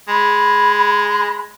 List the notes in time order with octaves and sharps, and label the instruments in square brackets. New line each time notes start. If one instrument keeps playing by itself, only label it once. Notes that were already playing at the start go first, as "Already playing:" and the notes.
[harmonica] G#3 [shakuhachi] B5